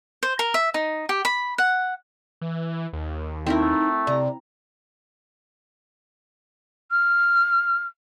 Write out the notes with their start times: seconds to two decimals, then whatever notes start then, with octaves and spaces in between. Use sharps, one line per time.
0.23 C5
0.39 A#4
0.54 E5
0.74 D#4
1.09 G4
1.25 B5
1.58 F#5
2.41 E3
2.93 D#2
3.47 A3 C4 D#4 E4 A#4
4.07 C3 D5 A#5
6.91 F6